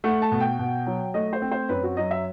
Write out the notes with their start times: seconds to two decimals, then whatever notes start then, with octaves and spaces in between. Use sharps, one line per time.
0.04 A3 F#5
0.22 A5
0.32 B2
0.40 G5
0.59 B2
0.86 F#3
1.14 A3 D#5
1.33 C5
1.42 C4
1.51 C5
1.69 F#2 B4
1.83 F#4
1.97 F#3 D#5
2.11 E5